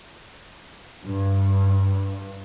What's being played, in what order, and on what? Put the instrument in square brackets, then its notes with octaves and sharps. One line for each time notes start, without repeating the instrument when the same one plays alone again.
[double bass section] G2